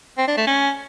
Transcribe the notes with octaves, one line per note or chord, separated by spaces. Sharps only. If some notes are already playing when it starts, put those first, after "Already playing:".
C4
D4
A3
C#4